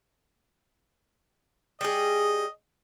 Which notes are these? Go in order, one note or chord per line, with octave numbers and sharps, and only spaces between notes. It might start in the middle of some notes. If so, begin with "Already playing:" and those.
G3 G#4 D#5